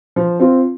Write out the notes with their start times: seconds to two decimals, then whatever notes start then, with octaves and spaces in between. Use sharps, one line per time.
0.16 F3
0.40 C4 F4